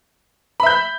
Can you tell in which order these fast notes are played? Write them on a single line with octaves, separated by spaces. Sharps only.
B5 E5 G6